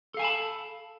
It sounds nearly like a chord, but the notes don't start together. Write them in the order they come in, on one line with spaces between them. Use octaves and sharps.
A4 F5 G#5 A5 B5